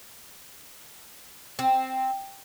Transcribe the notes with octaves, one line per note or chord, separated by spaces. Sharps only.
C4